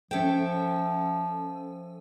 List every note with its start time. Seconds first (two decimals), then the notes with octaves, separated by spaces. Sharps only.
0.11 F3 C#4 A4 E5 G5